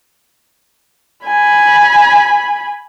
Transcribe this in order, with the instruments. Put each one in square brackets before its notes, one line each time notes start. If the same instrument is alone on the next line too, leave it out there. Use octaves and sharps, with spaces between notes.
[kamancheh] G#5 B5